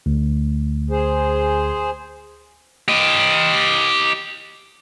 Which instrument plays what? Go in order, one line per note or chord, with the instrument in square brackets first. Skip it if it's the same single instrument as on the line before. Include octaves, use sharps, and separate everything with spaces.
[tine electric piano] D2
[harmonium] G#4 C5
[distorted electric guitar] G4 D#5